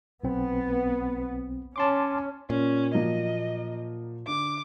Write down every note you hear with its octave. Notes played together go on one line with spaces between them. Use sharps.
B1 B3 C4
C#4 A5 C6 D6
A#2 C#4
F3 F#3 A#3 D#5
D3 D6